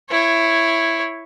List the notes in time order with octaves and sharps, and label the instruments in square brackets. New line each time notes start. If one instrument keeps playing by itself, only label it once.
[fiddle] E4 C#5